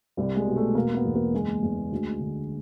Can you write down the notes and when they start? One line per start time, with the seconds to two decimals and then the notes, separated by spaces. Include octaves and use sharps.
0.17 C2 G3
0.36 G#3
0.47 B2
0.56 A3
0.75 E1 A#3
0.95 B3
1.05 E2
1.15 A#3
1.33 F#1 G#3
1.63 E2
1.92 D2
2.20 D3